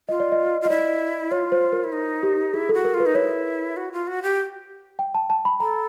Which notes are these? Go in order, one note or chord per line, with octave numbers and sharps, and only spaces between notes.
F4 D#5
D5
D#5
F4
D#5
E4 D5
F4 C#5
C5
A#4
E4
D#4
G4
E4 G#4
A4
F#4
A#4
F4
B4
D#4
E4 C#5
F#4
F4
F#4
G4
G5
A5
A5
B5
A4 A#5